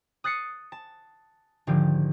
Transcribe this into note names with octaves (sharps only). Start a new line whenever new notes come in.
D#6 F#6 A6 C7 C#7
A5
G#1 D3 F3 G4